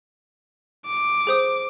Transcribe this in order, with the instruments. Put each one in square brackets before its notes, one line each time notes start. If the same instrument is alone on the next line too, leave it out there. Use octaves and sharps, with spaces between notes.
[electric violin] D6
[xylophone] G#4 C5 D#6